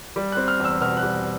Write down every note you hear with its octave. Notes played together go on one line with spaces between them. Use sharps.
G3
F#6
C4
F6
E2 E6
B2 F6
F#6
G3